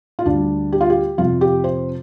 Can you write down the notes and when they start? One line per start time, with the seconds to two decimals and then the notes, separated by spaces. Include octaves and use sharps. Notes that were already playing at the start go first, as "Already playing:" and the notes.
0.19 F4
0.26 D2 D3 G3 D4
0.72 G4
0.81 F4
0.90 G4
1.18 F2 C3 F3 F4
1.41 G4
1.64 C5